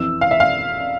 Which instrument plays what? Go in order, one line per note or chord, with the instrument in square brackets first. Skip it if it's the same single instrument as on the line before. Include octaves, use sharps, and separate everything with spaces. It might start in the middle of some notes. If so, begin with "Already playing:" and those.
Already playing: [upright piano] F2 E3 E6
F5
E5
F5